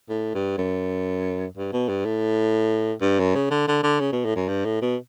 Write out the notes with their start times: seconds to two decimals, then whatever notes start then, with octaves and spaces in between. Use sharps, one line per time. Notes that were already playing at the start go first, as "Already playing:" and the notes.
0.09 A2
0.35 G2
0.58 F#2
1.57 G2
1.73 B2
1.89 G2
2.05 A2
3.02 G2
3.19 F#2
3.35 C#3
3.51 D3
3.68 D3
3.83 D3
4.00 C#3
4.13 B2
4.25 A2
4.36 F#2
4.49 G2
4.65 A2
4.82 B2